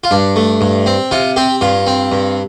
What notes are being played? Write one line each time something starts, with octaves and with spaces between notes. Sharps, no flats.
F4
G2 D4
A3
G2
C4
C3 F4
C4 G4
G2 F4
C4
G2